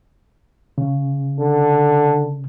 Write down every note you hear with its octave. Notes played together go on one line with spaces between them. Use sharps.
C#3
D3